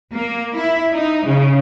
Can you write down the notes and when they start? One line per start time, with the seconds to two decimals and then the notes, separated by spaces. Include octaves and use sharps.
0.13 A#3
0.56 E4
0.93 D#4
1.26 C#3